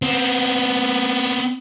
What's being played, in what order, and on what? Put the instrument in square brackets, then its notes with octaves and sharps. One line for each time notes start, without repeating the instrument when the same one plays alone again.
[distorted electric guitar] B3 C4